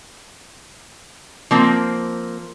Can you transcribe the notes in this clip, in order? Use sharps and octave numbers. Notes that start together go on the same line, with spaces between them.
F3 A#3 C4